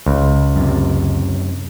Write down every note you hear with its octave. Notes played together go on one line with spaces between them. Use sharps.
C#2
F#2 C3